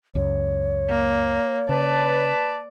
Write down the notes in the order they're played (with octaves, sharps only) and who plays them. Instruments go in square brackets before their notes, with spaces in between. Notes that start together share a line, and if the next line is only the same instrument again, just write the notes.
[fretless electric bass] C#2 F#2 [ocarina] C#5
[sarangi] A#3
[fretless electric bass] C#3 [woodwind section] B4 A5 [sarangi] D5